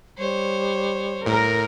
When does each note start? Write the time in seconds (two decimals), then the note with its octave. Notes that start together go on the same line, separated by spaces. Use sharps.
0.18 G3 C5 C#5
1.26 A2 A#4